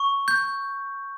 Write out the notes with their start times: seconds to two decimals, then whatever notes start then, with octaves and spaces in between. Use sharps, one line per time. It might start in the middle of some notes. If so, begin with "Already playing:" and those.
Already playing: C#6
0.28 G6